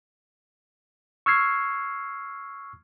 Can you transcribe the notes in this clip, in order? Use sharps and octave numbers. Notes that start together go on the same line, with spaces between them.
C#6 E6 F6 G#6 C7